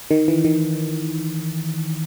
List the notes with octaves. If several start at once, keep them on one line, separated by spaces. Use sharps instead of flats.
D#3
E3
D#3